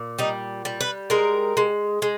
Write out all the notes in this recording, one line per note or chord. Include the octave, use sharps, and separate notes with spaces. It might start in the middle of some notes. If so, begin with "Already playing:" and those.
Already playing: A#2
G3 D#4
G3
B4
G#3 A#4
G#3
G#3